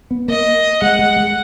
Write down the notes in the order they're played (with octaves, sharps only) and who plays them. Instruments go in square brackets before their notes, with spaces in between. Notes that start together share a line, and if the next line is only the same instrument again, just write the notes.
[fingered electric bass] B3
[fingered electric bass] A#3 [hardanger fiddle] D#5
[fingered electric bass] G#3 [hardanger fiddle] F#5
[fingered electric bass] G#3
G#3